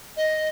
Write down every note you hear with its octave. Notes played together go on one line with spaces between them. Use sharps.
D#5